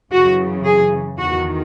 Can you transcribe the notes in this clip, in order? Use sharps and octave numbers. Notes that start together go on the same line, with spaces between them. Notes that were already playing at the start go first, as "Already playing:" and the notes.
F#2 C#3 E3 F#4
G#4
E2 D#3 F#4